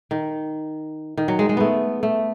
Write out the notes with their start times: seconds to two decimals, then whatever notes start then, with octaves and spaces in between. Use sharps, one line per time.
0.11 D#3
1.17 D#3
1.28 F#3
1.39 G#3
1.49 G#3
1.57 A3 B3
2.03 A3